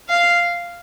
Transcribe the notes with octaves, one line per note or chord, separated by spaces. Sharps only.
F5